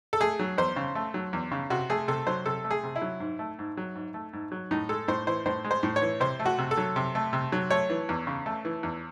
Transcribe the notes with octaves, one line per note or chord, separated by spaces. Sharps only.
A4
A3 G#4
F#3
E2 C5
C#3
A3
F#3
E2
C#3
C3 F#4
A3 G#4
C3 A4
F#3 C5
C3 A4
A3
G#4
C3
E4
F#3
G#2
A3
G#2
F#3
G#2
A3
G#2
F#3
A2 D#4
G#3 A4
A2 C5
E3 C5
A2 C5
G#3
C5
A2
C#5
E3
C3 C5
A3
F#4
C3
A4
F#3
C3
A3
C3
F#3
A3 C#5
E3
E2
C#3
A3
E3
E2